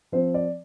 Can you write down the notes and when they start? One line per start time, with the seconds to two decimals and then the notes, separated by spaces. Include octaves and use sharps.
0.12 F3 C4 C5
0.34 D5